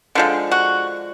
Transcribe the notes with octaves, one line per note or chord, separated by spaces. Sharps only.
D3 F3 G#3
F#4